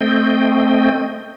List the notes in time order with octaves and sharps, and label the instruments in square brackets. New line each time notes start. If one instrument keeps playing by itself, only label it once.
[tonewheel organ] A3 C4 D#5 G5